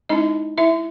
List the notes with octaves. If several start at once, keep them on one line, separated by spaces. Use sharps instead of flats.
G#3 C#4 D#4 E4 D#5
E4 E5